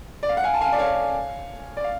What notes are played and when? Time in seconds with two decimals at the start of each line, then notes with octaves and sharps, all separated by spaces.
0.23 D5
0.29 F5
0.37 F#5
0.44 F5 G#5
0.54 A5
0.61 F5 G#5
0.72 D5
0.78 C#5 F5
1.77 D5
1.84 F5